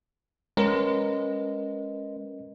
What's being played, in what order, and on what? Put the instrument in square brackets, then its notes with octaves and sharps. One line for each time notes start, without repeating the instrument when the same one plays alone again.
[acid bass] G#3 [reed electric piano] C#4 A#4 B4